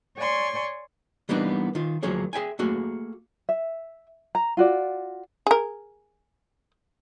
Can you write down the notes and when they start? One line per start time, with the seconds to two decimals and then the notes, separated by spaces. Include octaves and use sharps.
0.17 C#5 D5 G#5 C6 C#6
1.29 E3 G3 A#3 B3 D4 D#4
1.75 D#3 F4
2.03 D2 F3 F#3 A#3 G#4 C#5
2.33 G#4 E5 G5 G#5
2.59 A3 A#3 F#4 G#4
3.49 E5
4.35 A#5
4.57 F4 F#4 D5
5.47 G#4 A#4